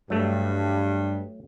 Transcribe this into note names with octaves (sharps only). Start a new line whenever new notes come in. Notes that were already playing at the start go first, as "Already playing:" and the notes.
G2 F#3 A3